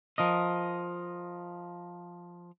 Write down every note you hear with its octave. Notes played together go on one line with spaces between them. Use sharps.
F3 A#4 D#5